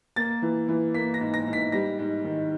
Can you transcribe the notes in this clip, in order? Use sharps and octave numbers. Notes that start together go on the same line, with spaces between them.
A#3 A6
E3
E3
A#3 B6
A#6
G#2
A#6
G#2
B6
G3 A#6
G#2
D#3